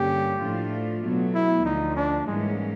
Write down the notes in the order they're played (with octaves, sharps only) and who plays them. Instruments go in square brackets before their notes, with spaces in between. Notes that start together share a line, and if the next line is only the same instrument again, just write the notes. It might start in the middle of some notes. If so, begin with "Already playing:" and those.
Already playing: [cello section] G2 D3 G3 A#3 C#4 [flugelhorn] G4
[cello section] A2 F3 A3 D4 F4
B2 F#3 A3
[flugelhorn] E4
[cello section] D2 D3 F3 [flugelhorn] D#4
[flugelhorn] D4
[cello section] G#2 E3 G3 A#3 C#4 [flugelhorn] G#3